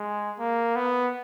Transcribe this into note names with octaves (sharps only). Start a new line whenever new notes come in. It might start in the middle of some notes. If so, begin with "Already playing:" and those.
Already playing: G#3
A#3
B3